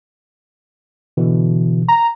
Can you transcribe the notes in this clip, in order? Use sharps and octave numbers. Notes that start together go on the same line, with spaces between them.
B2 D3 E3
A#5